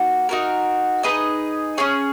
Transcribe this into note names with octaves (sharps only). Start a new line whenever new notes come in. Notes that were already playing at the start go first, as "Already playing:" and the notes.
Already playing: A#3 D#4 F#4
D#4 F#4 A#4
D#4 G#4 B4 D#5
C#4 G#4 C#5